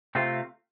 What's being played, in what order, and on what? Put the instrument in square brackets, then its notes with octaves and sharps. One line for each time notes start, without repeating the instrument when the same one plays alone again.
[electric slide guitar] C3 A3 C4 F4